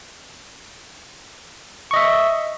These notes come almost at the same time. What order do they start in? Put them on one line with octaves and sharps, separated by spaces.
C#6 D#5 E5